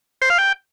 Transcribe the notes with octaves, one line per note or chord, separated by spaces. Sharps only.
C5
F5
G5